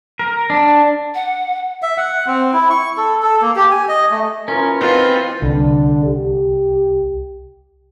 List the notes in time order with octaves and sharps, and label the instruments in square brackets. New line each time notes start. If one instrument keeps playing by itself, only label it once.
[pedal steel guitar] A#4
D4
[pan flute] F#5
[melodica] E5
F#5
C4
E4
C#6
A4
A4
A#3
G4
G#5
D#5
A3
[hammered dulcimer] E3 F4 [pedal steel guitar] C#4 [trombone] A#4
[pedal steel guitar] C4 D#4 [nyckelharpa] F4 B4 [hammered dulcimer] F#5 B5
[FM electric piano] C2 [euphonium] D3
[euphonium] G4